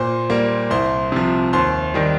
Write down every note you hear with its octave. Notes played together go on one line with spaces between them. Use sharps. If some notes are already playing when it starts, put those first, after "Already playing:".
Already playing: A#2 C5 C6
G3 A#3
C2 C5 C6
C3 F3
D#2 C5 C6
D#3 G3